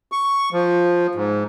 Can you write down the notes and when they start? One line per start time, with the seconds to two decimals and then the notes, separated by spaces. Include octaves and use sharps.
0.12 C#6
0.52 F3
1.15 G#2